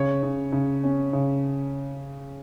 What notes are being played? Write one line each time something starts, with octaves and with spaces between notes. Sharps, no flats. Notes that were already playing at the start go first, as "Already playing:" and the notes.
Already playing: C#3 C#5
C#3
C#3
C#4
C#3